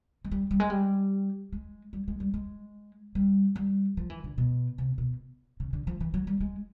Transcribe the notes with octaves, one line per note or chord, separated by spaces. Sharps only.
G#3
G3
G3
G#3
G3
G#3
G3
G#3
G3
G#3
G3
G3
F3
E3
D3
B2
C3
B2
C#3
D3
F3
E3
F#3
G3
G#3